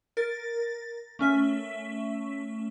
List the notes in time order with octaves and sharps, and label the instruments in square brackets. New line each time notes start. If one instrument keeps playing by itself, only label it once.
[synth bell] A#4 A6
A3 C#4 E5 B6